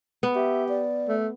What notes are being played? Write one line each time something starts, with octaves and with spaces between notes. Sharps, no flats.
B3
G4 E5
D5
A3